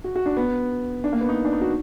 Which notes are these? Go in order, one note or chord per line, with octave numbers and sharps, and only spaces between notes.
F#4
F#4
D4
B3
D4
A#3
B3
D#4
D4
D#4
F#4